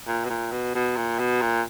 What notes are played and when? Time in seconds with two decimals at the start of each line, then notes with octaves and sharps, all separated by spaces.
0.08 A#2
0.25 B2
0.29 A#2
0.52 B2
0.75 B2
0.97 A#2
1.19 B2
1.41 A#2